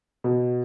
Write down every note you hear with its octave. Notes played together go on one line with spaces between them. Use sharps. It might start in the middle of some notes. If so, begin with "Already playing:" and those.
B2